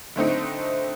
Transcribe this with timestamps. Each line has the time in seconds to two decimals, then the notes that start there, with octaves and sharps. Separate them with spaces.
0.16 D3 A3 C4 D#4